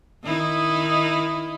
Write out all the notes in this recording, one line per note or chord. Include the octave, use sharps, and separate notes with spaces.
D#3 D#4 E4